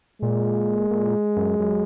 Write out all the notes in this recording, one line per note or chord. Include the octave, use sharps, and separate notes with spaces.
A#2 G#3
A#2
F#2
F#2